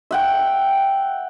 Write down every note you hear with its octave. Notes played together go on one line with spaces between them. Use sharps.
E5 F#5 G5